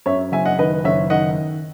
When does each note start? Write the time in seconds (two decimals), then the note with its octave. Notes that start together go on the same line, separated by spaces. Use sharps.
0.06 F#2 C#5 E5
0.32 F#1 E5 G#5
0.46 D#5 F#5
0.59 D#3 B4 D#5
0.84 F#1 C#5 E5
1.10 D#3 D#5 F#5